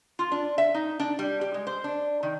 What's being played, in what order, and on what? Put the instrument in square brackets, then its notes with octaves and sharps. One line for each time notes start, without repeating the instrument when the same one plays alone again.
[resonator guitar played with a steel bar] F4
D4
E5
D#4
D4
G3
G4
G#3
C5
D4
D#3